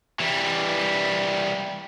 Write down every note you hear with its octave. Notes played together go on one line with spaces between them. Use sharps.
E3 G3